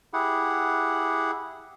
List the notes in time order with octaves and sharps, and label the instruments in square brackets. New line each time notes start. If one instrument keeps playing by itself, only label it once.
[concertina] E4 G4 G#4 F#5